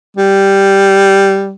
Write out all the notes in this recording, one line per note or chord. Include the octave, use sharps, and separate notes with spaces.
G3